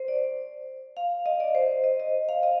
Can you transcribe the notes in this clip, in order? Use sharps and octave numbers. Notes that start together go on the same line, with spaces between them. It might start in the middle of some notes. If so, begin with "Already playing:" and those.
Already playing: C5
D5
F5
D#5
D5
C5
D#5
D#5
F5
D#5